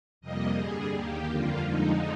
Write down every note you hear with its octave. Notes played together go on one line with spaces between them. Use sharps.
F2 C3 G3 A#3 D#5
G2 D3 G3 G#4
D#2 D#3 A#3 G4
F2 D3 G3 A#3 F4
F2 D3 F3 G#3 D#4